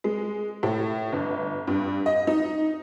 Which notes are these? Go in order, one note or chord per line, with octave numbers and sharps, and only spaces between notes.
G#3
A2
G1
G2
D#5
D#4